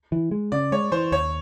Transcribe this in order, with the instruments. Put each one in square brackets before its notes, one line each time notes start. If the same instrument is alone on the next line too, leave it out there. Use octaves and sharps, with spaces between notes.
[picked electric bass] E3
G#3
[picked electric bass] C#3 [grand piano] D5
[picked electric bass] G#3 [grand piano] C#5
[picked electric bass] E3 [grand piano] C5
[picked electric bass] D#2 [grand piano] C#5